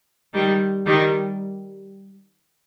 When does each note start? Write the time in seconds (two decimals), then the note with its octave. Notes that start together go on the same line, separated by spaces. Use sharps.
0.33 D#3 G3
0.86 D#3 G3